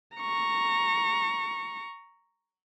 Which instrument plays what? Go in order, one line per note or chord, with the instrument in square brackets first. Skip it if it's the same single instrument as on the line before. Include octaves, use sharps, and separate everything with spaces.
[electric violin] A#5 C#6